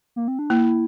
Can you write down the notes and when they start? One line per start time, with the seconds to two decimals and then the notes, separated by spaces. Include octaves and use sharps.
0.16 A#3
0.28 C4
0.39 D4
0.50 A#3 E4